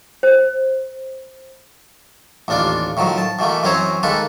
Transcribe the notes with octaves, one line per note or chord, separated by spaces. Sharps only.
C5
A1 D#2 D4 F4 D5
A2 D#3 F3 F#3
A5
B2 E3 A3 A#3
F#2 E3 C4 C5 C#5 A#5
D#3 G#3 A#3 A4 B4